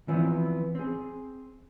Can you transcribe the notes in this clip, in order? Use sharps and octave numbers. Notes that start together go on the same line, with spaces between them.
E3 F3 B3 C4
C4 G#4